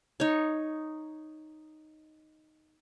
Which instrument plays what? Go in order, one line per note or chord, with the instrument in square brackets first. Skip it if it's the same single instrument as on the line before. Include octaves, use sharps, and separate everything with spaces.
[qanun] D#4 C#5